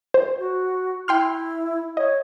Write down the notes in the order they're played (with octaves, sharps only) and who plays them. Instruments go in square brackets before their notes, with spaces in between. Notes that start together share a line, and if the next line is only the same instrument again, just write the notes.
[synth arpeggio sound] C5
[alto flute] F#4
[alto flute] E4 [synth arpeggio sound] G5 C6 F6
[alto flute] C#5 [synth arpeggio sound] D#5